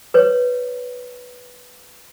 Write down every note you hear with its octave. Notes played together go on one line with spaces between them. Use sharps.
B4 C#5